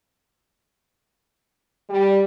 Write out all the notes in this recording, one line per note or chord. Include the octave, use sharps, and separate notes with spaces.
G3